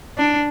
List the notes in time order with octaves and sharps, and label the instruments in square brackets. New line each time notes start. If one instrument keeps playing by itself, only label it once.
[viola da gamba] D4